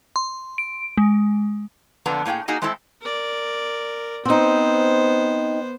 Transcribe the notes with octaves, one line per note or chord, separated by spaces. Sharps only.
C6
D7
G#3
F2 A#2 D3 B3 D4 A#5
A2 A#3 D4 G#4 G5
A#3 D#4 F#4 G#4
G#3 A3 C4 E4 G4 A4
A#4 D5
B3 C4 D#4 C5